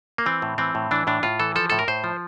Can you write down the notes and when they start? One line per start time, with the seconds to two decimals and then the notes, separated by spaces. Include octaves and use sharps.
0.18 A#3
0.26 E3 C4
0.42 A2
0.58 E3 C4
0.75 A2
0.91 E3 D4
1.07 A2 D4
1.23 A2 F4
1.40 E3 A4
1.56 F3 A4
1.70 A2 A4
1.79 A#4
1.88 A2 C5
2.04 F3